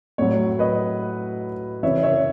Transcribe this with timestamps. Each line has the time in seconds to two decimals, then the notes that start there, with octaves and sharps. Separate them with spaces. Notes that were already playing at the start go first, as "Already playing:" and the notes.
0.18 A2 F#3 C#5
0.59 B4 D#5
1.83 C#3 E3 C#5 E5
2.03 C#5 E5